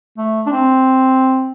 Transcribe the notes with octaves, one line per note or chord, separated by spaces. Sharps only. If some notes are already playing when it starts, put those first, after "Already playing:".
A3
D4
C4